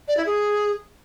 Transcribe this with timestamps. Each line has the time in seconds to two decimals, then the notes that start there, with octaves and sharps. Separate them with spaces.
0.08 D5
0.17 E4
0.26 G#4